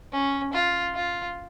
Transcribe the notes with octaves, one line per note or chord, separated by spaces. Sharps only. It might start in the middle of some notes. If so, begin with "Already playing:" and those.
C#4
F4
F4